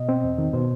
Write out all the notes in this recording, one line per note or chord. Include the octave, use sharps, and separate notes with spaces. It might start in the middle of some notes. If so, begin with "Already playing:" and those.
Already playing: B2 D#5
C4
E2
D#3
B2 C5